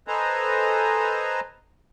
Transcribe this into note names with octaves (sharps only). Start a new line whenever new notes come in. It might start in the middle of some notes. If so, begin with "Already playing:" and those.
A4 B4 C5 D#5 G#5 A#5